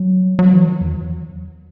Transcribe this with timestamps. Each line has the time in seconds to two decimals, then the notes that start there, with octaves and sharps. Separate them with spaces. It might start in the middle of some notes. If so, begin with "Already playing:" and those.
Already playing: F#3
0.39 F#3
0.53 E3
0.67 D#3
0.81 E2